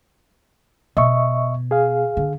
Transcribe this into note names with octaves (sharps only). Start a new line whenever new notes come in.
B2 D#5 E5 C#6
G#4 F5
D3